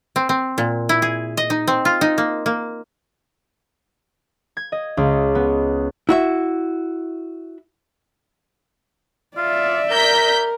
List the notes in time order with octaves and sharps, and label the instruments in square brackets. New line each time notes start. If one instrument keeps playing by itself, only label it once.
[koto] C4
C4
A#2
E4
G#4
D#5
D#4
C4
F4
D#4
A#3
A#3
[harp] G#6
D#5
C#2
B3
[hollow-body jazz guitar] E4 F#4 E5
[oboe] F4 [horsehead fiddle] D5 E5
[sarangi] A#4 [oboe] A#5 [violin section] G6 B6